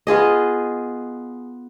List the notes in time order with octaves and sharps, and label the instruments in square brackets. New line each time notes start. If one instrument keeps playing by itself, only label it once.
[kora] B3 F4 G#4 D#5